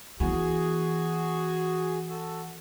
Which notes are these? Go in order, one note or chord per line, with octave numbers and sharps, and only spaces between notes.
E3 B3 F#4 G#4
F#4 A4